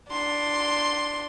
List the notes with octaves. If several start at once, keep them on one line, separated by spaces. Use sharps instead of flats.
D4 C6